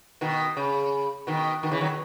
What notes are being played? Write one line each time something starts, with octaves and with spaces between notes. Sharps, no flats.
B2 D#3
C#3
B2 D#3
B2 D#3
C#3 E3
D#3 F#3
B2